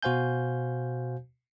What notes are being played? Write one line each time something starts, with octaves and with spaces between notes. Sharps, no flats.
B2 F#4 C5 F5 G#5 G6